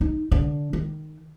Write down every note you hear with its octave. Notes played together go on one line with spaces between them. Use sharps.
D#4
D3 D4
D#3